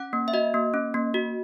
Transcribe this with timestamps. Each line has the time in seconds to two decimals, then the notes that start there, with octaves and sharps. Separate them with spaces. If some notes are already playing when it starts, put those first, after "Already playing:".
Already playing: C#4 F#5
0.13 A#3
0.28 E5
0.33 F#4 D#5
0.54 A#3
0.74 C#4
0.94 A#3
1.14 F#4